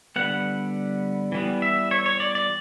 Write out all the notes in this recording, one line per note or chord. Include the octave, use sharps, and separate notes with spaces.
D3 G3 B3 F#5
E3 G3 B3
E5
C#5
C#5
D5
D5